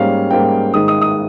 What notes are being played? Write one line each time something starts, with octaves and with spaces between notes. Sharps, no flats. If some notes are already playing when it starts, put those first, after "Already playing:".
Already playing: G#2 G3 A#3 C#4 F5
G#2 G3 A#3 C#4 G5
G#2 D#3 G#3 D#6
D#6
D#6